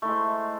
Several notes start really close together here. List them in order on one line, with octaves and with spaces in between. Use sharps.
A3 E4 G#3 C5